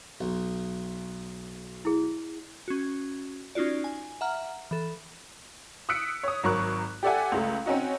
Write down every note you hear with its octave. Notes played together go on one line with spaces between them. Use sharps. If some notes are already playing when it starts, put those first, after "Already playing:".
B1
E4 G#4
C#4 F#4
C#4 D#4 F4 F#4 D5
G#5
E5 F#5 A#5 F6
E3 A4
D#6 E6 F#6 B6 C#7 D7
C#5 D#6
G#1 F#3 A#4 C#6 F#6
G4 A4 D5 E5 F#5 G#5
C#2 A3
C4 C#4 D#4 F#4